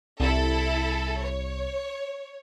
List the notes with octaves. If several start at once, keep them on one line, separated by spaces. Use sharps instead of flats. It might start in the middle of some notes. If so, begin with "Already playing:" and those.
C2 E4 A4
C#5